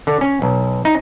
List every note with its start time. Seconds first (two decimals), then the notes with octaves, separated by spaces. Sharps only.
0.07 D3
0.21 C#4
0.42 B1
0.85 D#4